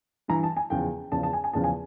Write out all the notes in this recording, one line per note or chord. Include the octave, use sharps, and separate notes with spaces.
G2 E3 A#5
A5
G#5
E2 C#3 F3 G5
E2 C#3 F3 A5
A5
G#5
G#5
E2 C#3 F3 A5
G#5